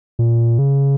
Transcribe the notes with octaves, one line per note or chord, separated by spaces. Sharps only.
A#2
C#3